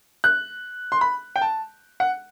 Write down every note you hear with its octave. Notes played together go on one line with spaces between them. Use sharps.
F#6
C6
B5
G5
A5
F#5